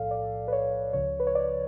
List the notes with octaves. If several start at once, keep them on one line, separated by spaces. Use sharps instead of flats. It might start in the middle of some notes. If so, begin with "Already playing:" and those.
Already playing: B1 A2 F3 A4 D5 F5
D5
B4
C#5
C#2 C#3 F3 C#5
B4
C#5
D5